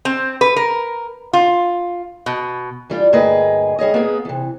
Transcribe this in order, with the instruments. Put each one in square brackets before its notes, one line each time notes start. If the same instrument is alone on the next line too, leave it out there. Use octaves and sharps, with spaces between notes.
[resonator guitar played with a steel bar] C4
B4
A#4
F4
B2
[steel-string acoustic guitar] E3 G3 F4
D2 G2 A#3 G#4 B4 D#5
G3 G#4 C#5 D#5
A#3 B3 G#4
C3 E3